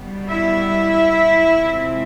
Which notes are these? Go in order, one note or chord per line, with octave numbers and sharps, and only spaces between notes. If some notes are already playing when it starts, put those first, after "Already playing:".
Already playing: B2 G3 B3
E4 E5
C3 F3 G#3 C4